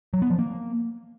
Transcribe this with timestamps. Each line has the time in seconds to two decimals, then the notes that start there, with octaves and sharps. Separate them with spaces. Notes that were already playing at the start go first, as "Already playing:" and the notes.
0.13 F#3
0.22 B3
0.30 F3
0.39 A#3